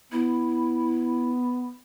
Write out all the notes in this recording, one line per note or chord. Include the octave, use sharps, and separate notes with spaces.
B3 E4